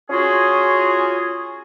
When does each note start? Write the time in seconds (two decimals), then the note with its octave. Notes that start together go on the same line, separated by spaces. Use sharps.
0.10 C#4 F4 F#4 G#4